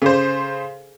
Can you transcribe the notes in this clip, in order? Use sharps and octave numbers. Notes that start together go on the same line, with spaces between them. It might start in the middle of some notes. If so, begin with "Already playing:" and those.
C#3 G#4 A4 C5